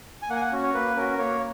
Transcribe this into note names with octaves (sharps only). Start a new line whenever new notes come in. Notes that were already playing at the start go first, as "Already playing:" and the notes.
G#5
A#3 F#5
G#5
F#5
C#4 F#4
C#5
A#3 B4
C#4 F#4 A#4
A#3 C#5